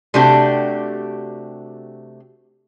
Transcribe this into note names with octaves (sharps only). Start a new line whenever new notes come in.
C3 A3 D4 F#4 G4